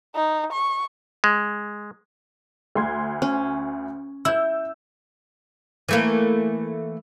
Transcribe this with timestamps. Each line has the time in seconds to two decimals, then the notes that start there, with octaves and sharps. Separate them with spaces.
0.16 D#4
0.53 C#6
1.24 G#3
2.75 D2 C6 G#6
3.22 C#4
4.25 E4 E6 G6
5.89 E3 A3 A#3